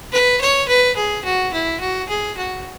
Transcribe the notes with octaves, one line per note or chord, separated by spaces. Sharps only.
B4
C#5
B4
G#4
F#4
E4
F#4
G#4
F#4